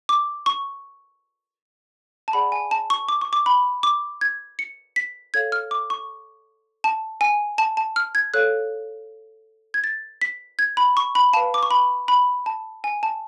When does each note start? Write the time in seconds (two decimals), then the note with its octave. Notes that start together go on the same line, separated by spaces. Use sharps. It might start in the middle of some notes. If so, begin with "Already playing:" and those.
0.09 D6
0.46 C#6
2.28 A5
2.33 G#4 D5 F#5 B5
2.52 G#5
2.71 A5
2.90 C#6
3.09 D6
3.21 C#6
3.33 D6
3.46 B5
3.83 D6
4.21 G#6
4.59 C#7
4.96 B6
5.34 A4 C#5 F5 G#6
5.52 F6
5.71 D6
5.90 C#6
6.84 A5
7.21 G#5
7.58 A5
7.77 A5
7.96 F6
8.15 G#6
8.34 A4 C#5 F5 F#6
9.74 G#6
9.84 A6
10.21 B6
10.59 G#6
10.77 B5
10.97 C#6
11.15 B5
11.33 B4 F5 A5
11.54 D6
11.63 C#6
11.71 B5
12.08 B5
12.46 A5
12.84 G#5
13.03 A5